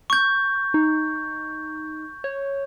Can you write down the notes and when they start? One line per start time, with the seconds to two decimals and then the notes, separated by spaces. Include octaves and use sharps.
0.10 C#6 G6
0.74 D#4
2.24 C#5